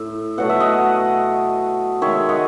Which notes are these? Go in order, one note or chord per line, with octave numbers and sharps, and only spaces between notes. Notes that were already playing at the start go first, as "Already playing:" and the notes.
Already playing: A2 E5
B2 F#3 A3 F#5
E5
D#5 F#5
D#3 G#3 C#5 E5
D#5 F#5